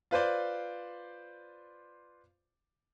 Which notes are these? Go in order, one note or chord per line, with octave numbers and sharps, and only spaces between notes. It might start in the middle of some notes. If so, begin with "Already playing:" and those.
F4 B4 C5 D5